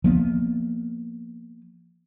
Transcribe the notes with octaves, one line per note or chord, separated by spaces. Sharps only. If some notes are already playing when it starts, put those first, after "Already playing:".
F3 A#3 B3